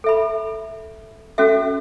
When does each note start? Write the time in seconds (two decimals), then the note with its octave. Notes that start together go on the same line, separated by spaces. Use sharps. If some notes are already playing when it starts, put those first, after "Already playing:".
0.04 A4 E5 B5
1.38 C#4 F#4 A4 E5